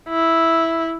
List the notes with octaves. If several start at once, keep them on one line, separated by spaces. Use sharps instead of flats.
E4